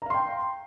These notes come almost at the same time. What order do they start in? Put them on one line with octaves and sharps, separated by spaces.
A#5 F5 C6 G5